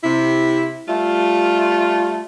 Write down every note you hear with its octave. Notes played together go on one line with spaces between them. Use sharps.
C3 E4
G3 A3 F4